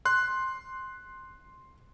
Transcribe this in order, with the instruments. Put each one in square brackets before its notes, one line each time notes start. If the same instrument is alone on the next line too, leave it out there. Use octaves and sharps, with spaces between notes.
[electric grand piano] C6 F#6